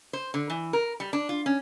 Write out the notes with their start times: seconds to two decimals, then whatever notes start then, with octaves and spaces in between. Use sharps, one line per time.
0.13 C5
0.34 D3
0.50 E3
0.73 A#4
1.00 G3
1.13 D4
1.29 F4
1.46 C#4